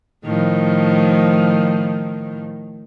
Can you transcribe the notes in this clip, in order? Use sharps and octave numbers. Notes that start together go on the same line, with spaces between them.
A2 D#3 F3